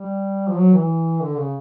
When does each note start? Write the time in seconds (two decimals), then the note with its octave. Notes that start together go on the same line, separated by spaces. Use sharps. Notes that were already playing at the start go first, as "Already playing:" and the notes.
Already playing: G3
0.48 F3
0.57 F#3
0.74 E3
1.21 D3
1.37 C#3